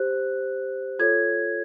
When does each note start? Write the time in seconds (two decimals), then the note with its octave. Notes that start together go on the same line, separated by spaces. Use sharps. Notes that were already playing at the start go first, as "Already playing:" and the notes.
Already playing: G4 C5 F#6
0.99 F4 A4 C#5 G#6